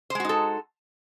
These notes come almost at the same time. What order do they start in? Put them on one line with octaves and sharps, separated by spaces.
C5 G#3 F#4 D#4 A4